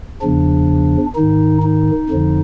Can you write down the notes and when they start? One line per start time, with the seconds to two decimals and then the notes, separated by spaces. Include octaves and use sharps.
0.21 E2 C#3 F3 D4
1.16 G#2 D#3 D#4
1.63 D#4
2.10 F2 D3 F3